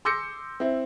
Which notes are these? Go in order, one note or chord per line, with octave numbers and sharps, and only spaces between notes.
C6 D6 E6 G6 A#6 C#7
C4 E4